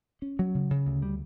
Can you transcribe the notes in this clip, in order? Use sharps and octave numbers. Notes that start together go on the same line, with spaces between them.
C#4
F#3
C#3
C#3
D2
G3